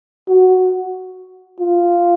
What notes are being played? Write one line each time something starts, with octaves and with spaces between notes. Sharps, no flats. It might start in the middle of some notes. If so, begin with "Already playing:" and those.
F#4
F4